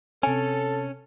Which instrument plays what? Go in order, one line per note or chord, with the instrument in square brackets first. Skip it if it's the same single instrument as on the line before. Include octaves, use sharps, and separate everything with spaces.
[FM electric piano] C3 C#5 C#7 [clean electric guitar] C#4 [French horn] A4 [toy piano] G#5